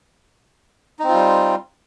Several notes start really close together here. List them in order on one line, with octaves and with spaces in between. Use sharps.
D#4 C4 F4 G3